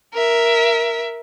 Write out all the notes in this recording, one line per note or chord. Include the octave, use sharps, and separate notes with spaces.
A#4 E5